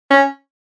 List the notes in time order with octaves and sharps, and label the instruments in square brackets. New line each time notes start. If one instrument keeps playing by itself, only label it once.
[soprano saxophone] C#4